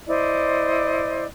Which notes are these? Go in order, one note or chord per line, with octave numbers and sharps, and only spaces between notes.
E4 C5 D5 D#5